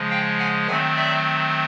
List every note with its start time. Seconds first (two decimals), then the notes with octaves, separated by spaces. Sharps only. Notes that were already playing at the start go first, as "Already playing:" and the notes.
Already playing: C#3 F3 G#3
0.10 F5 G5
0.39 F#5 G#5
0.68 D#3 F#3 A3 C4 F#5 G#5
0.96 D5 E5